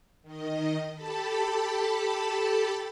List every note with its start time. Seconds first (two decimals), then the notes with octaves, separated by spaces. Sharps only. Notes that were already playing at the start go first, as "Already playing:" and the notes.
0.22 D#3 D#5
0.94 G4 A4 A5 B5